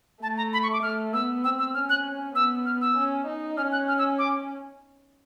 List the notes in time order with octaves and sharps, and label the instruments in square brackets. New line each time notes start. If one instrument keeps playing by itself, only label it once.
[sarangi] A3 [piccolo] A5
[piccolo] A#5
B5
C#6
D6
[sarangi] A3 [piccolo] F6
[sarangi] B3 [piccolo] E6
[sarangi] C4 [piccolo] E6
[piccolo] E6
[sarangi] C#4 [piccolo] F6
[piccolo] F#6
[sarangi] B3 [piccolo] E6
[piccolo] F6
E6
[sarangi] C#4
D#4
[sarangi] C#4 [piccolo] F6
[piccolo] F#6
F6
E6
D6